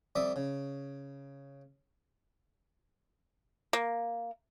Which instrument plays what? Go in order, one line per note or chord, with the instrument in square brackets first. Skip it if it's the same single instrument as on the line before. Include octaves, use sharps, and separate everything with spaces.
[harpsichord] F2 G3 D5 E5 D#6
C#3
[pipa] A#3